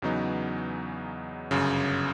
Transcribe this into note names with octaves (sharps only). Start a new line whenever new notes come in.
E2 C#3 F#3 B3 D#4
G1 F#2 C#3